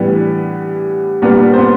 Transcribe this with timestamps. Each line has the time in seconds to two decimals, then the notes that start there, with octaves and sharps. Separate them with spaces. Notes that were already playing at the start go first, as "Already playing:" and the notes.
Already playing: A2 E3 G3 B3 D4 B4
1.22 A#2 G3 A#3 B3 D4 B4
1.53 C5
1.58 B3 B4